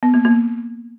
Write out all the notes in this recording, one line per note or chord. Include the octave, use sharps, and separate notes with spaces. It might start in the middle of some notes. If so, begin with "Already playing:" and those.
B3
A#3
A#3